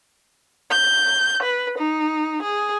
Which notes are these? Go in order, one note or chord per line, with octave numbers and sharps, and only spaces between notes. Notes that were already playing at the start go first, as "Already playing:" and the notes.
G6
B4
D#4
G#4